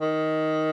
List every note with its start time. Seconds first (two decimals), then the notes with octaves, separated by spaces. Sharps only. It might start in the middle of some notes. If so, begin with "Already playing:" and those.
0.01 D#3